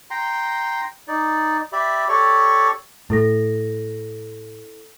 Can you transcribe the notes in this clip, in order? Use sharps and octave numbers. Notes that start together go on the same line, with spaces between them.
G5 A#5 C6
D#4 D5
G4 D5 E5 B5
G4 A4 C#5 D5 C#6
A2 E4 A4 A#6